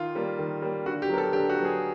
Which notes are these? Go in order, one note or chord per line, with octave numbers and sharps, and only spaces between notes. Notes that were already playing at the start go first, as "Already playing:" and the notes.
Already playing: D#3 F4
G3 A#3
D#3
G3 A#3
D3 F#4
G4
F#3 B3 A#4
A4
D3 G4
F#4
F#3 B3
G#4